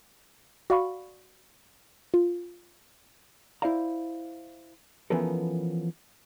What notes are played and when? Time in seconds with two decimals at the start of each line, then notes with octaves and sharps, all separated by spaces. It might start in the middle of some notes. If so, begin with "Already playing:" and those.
0.70 F#4 D5 F5 B5 C#6
2.14 F4
3.62 E4 C5 D5 F5 A#5
5.10 E3 F3 B3 C#4 A4 A#4